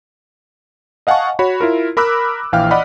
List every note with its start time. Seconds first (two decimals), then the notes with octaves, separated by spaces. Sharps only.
1.07 D#5 F5 F#5 G#5 A5 C#6
1.39 F#4 C#5 B5
1.60 E4 F4 A#4
1.97 A#4 B5 D6 E6 F#6
2.52 A#1 E3 F5 G5 F6
2.71 D5 D#5 F#5 B5 F6